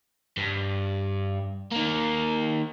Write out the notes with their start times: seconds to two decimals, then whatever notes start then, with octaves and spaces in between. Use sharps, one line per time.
0.37 G2
1.72 D#3 A#3